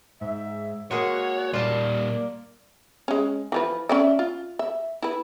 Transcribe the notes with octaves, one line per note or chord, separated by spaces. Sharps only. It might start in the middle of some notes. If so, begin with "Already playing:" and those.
G#2 E5
G#3 A#3 F#4 G#4 C#5 F#5
A#2 G3 A#3 F4 D5 A5
G#3 C#4
E3 F3 B4
C#4 D5 E5
F4
E5
E4 B4